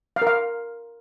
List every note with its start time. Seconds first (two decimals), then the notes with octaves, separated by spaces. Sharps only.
0.16 F5
0.22 A#4
0.27 F5